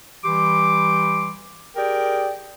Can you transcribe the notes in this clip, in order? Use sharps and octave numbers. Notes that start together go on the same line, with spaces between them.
E3 G3 G4 C6 D6
G4 G#4 A#4 D5 G5